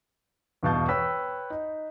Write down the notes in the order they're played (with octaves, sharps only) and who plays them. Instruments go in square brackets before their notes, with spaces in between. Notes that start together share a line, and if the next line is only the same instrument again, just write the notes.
[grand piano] E2 G2 B2 F5 A5 G6
B4 C#5 G5 E6 B6
D#4